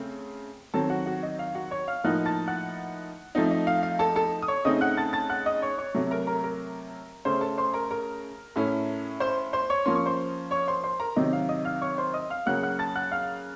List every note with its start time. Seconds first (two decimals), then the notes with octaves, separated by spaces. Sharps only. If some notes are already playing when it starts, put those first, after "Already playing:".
Already playing: C#3 A3 C4
0.74 D#3 F#3 C4 A4 A5
0.90 F#4 F#5
1.06 F#4 F#5
1.23 D#5
1.39 F5
1.55 F#4 F#5
1.71 C#5 C#6
1.88 F5 F6
2.04 A2 F3 A#3 D#4 F#5 F#6
2.26 A5 A6
2.48 F#5 F#6
3.35 F3 A3 C4 D#4
3.51 D#5
3.67 F5
3.83 F5
3.99 A4 A5
4.16 A4 A5
4.42 D#6
4.48 C#5 C#6
4.65 C#3 A3 C4 D#4 D#5 D#6
4.81 F#5 F#6
4.97 A5 A6
5.13 A5 A6
5.30 F#5 F#6
5.46 D#5 D#6
5.62 C#5 C#6
5.78 C#5 C#6
5.95 C3 F#3 A3
6.11 A#4 A#5
6.27 A#4 A#5
6.44 A#4 A#5
7.25 C#3 A3 C#4 C5 C6
7.41 A4 A5
7.58 C5 C6
7.74 A#4 A#5
7.91 A#4 A#5
8.56 A2 A3 C#4
9.20 C5 C6
9.53 C5 C6
9.70 C#5 C#6
9.86 F3 A#3 C#4 C6
9.96 C#6
10.06 C5 C6
10.51 C#5 C#6
10.68 C5 C6
10.84 C5 C6
11.00 A#4 A#5
11.16 C3 D#3 F#3 C4 D#5
11.33 F5
11.49 D#5 D#6
11.65 F5 F6
11.82 C#5 C#6
11.98 C5 C6
12.14 D#5 D#6
12.30 F5 F6
12.46 C#3 F#3 A#3 F#5 F#6
12.63 F#5 F#6
12.79 A5 A6
12.95 F#5 F#6
13.12 F5 F6